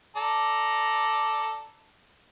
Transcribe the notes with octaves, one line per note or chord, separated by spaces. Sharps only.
A4 D5 A#5